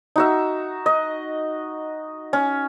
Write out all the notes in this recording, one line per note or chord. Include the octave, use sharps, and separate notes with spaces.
D#4 F#4 E5
D#5
C#4